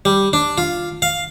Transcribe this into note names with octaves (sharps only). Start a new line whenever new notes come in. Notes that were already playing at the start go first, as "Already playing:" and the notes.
G3
D4
F4
F5